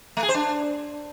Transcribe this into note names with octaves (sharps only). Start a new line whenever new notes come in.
A3
G#4
C5
D4